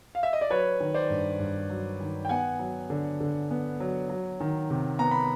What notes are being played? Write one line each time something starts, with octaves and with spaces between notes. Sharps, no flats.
F5
E5
D#5
D5
F#3 B4 C#5
D#3
C5 D5
G2
G2
F#3
D#3
G5
B3 F#5 G#5
F#3
D3
D3
B3
F#3
F#3
D#3
C3
B3 A#5
B5